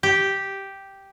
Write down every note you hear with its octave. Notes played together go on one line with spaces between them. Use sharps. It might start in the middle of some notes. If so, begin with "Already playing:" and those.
G4